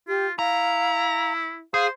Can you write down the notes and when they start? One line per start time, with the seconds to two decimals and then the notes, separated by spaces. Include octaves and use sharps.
0.08 F4 G4
0.39 E4 F5 A#5
1.74 G#4 C5 F5